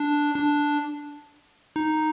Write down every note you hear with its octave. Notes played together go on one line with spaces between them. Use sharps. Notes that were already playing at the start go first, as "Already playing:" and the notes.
Already playing: D4
D4
D#4